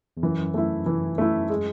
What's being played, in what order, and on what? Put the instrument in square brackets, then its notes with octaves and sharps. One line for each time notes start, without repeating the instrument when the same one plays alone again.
[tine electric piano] E2
[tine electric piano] F#2 [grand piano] E3
[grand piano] A3 E4
E3
A3 E4
G#3